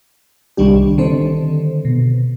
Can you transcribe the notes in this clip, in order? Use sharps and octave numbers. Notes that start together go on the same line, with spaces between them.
C2 D#3 G3 D4 G4
D3 D#3 C4 A4 C5
B2